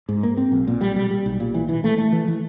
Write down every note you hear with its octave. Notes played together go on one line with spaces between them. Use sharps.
G#2
A#3
C4
B1
A#2
G3
G3
G3
B1
A#2
E3
E3
A3
A3
E3
E3